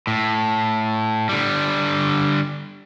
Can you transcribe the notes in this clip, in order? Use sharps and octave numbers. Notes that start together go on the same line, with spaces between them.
A2
D3 G3